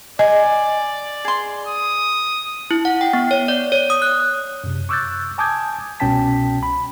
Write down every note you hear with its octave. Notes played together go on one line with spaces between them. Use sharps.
D5 D#5 G#5
G#4 C6
D#6
E4
F#5
G5
B3
C#5
D5
C#5
D#6
F#6
F#2 C3
C#6 D6 E6 F#6 G6 A6
G#5 A5 D6 D#6 G6 G#6
C2 B2 C#4 G5 A5 B6
B5